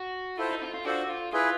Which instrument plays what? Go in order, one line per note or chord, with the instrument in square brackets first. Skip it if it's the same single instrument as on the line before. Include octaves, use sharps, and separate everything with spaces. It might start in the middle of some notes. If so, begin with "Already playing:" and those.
Already playing: [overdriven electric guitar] F#4
[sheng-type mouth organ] E4 A4 C5 [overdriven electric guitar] F4
[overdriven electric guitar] D#4
F4
F4
[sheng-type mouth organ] D4 F4 A4 C5 [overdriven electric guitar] F#4
[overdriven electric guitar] F4
[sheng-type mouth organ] E4 G#4 B4 [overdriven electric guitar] F4